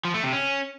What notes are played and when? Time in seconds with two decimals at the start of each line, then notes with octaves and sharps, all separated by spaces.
0.05 F3
0.14 A3
0.23 C3
0.33 C#4